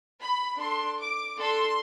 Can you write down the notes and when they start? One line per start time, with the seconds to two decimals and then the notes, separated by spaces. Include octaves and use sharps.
0.21 B5
0.59 D4 A4 C6
0.99 D6
1.38 D4 A4 C6